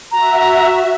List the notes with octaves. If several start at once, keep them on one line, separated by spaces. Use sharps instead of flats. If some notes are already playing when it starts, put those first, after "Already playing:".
F#4 E5 A#5